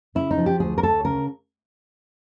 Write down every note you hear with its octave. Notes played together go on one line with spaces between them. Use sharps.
C#3 E4
D#4
F3
G4
D2 G#4
A#4
D2 A4
C#3 A#4